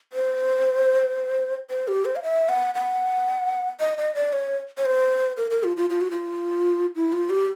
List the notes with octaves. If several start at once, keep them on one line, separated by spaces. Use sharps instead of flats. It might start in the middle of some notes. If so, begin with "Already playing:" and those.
C5
C5
G4
C5
F5
E5
F#5
F#5
D#5
D#5
D5
C#5
C#5
C5
A#4
A#4
F4
F4
F4
F#4
F4
E4
F4
G4